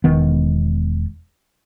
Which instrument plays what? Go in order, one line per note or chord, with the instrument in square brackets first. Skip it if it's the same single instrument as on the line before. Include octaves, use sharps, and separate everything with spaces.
[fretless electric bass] E1 D#3 B3